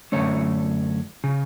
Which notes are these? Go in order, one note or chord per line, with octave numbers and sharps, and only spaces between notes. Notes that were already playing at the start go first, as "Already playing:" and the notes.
F#2 D3 A3 C#4 C#5
C#3